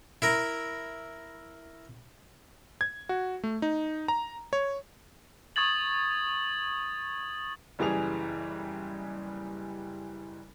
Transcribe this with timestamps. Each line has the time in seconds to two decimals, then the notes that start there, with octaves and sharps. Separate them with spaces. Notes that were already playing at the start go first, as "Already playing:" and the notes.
0.22 E4 A#4
2.81 G#6
3.09 F#4
3.44 A3
3.62 D#4
4.08 A#5
4.53 C#5
5.56 C#6 D#6 G#6 A6 F#7
7.79 F#1 E3 G3 G#4 F7